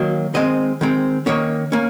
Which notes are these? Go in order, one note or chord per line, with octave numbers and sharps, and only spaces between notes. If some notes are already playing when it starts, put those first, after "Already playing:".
Already playing: D#3 F#3 A#3
D#3 G#3 C4 D#5
D#3 G#3 C4
D#3 A#3 C#4 C#5
A#3 C#4